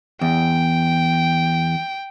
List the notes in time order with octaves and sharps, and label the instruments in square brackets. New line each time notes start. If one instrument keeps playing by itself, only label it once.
[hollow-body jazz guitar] E2 [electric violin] G5